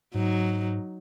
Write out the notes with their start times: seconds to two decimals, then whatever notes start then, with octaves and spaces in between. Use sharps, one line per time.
0.14 G#2 F#3 D#4